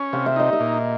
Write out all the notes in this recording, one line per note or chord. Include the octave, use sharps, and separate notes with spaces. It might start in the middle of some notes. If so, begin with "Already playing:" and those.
Already playing: C#4
C3 F5
E5
D#4 D#5
E5
A#2